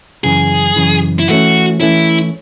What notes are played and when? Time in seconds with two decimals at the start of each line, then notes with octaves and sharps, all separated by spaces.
0.24 F#2 C#3 E3 G#4
0.76 F#2 C#3 E3
1.19 E4
1.28 E3 A3 C#4 F#4
1.80 E3 A3 C#4 E4